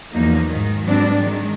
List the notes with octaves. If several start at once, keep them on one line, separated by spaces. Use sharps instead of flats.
E2 F3 F#3 A#3 D#4
G#2 D#3
G#2 F#3 G3 B3 C4 D4
D#3 F#3 G#3